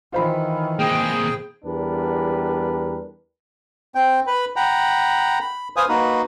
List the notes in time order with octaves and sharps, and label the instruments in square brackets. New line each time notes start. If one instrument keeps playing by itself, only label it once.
[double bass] D#3 E3 [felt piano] F4 C5 B5
[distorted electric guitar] C3 A#3 [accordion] G#4 G5
[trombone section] E2 G3 D4 A#4 B4
[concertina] C4 G5
B4 B5
F#5 G5 A#5 B5
B5
B4 C5 F5 G#5 D#6
A#3 D#4 F#4 B4